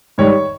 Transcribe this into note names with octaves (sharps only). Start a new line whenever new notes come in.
G#2 D#3 G3 C#5